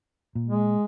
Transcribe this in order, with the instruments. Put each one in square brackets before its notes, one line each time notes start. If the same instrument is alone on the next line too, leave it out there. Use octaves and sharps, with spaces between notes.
[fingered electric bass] A#2
[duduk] G#3